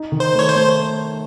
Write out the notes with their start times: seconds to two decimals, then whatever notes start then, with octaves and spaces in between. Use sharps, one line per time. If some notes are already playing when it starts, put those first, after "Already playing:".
Already playing: D#4
0.12 D#3
0.20 C5
0.35 A3 C#5
0.49 C5
0.55 A3